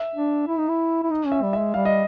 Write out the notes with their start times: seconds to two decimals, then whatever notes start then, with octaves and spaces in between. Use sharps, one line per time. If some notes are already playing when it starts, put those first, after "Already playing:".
Already playing: E5
0.15 D4
0.48 E4
0.58 D#4
0.69 E4
1.03 E4
1.11 D#4
1.26 C#4
1.32 E5
1.43 G3
1.53 G#3 E5
1.74 G3 F5
1.85 D#5